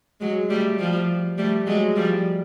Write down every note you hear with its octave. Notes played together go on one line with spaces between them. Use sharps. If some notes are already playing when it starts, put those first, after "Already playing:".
F#3 G#3
G3 A3
F3 G3
G3 A3
F#3 G#3
F3 G3